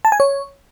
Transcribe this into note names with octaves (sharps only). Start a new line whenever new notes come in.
A5
G#5
C#5